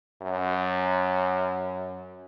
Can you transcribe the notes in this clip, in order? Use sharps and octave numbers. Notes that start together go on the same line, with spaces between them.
F#2